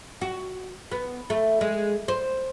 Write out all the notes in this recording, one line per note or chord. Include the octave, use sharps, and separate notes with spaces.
F#4
B3
A3
G#3
C5